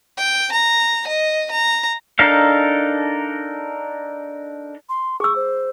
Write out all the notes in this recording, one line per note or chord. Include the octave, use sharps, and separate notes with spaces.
G5
A#5
D#5
A#5
D4 D#4 A4 A#4 F5
C6
G#4 C#6 E6
C5